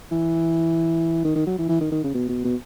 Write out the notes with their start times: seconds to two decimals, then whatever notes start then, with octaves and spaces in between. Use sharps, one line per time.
0.12 E3
1.24 D#3
1.35 D#3
1.47 F#3
1.59 E3
1.69 E3
1.81 D#3
1.92 D#3
2.04 C#3
2.15 B2
2.29 B2
2.44 B2